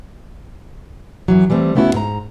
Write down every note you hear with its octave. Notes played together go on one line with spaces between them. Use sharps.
F#2 A#2 E3 F#3
E3 G3 A3 A#3 C4
C#3 A3 B3 C#4 E4 F#4
G#2 A#5